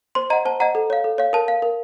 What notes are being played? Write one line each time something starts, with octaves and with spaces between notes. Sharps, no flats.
C5 C6
D#5 F#5 A#5
C5 A5
D#5 F#5 A#5
A4
C#5 F5
A4
C#5 F5
A#4 A5
F5
A#4